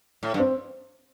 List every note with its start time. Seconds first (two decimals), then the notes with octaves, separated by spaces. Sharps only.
0.23 A2
0.34 G2
0.39 C4